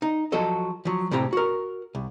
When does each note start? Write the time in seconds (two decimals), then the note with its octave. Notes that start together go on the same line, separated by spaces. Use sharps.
0.02 D#4
0.32 F3 F#3 F#4 A4 D#5
0.85 F3 F#3
1.11 A2 C3 C4 G4 A#5
1.33 F#4 A#4
1.95 C2